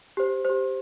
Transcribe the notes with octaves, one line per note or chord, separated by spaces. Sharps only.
G4 C5
G4 C5